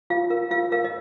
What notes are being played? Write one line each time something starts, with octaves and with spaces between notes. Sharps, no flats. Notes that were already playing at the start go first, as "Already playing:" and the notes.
F4 F5
A#4 F5
F4 F5
A#4 F5
D#5